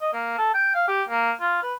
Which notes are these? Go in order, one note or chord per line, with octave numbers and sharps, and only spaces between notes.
D#5
A#3
A4
G5
F5
G4
A#3
F4
B4